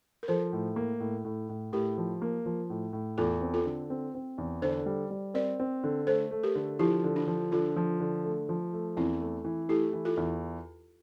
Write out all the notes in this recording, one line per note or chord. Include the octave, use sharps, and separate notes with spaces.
A#4
F3 A4 C5
A2
A#3
A2
A2
A2
A2 G4 A#4
F3
A#3
F3
A2
A2
E2 F4 A4
C4
F4 A4
D3
C4
C4
E2
D3 A4 C5
G3
G3
C4 A#4 D5
C4
D3
A3 A4 C5
A3
G4 A#4
D3
F3 E4 G4
D3
D4 F4
F3
D3 D4 F4
F3
D3
A3
F3
A3
E2 C4 E4
A3
E3
A3 E4 G4
E3
F4 A4
E2